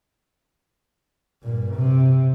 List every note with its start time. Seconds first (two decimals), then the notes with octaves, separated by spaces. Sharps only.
1.42 G2 A#2
1.74 C3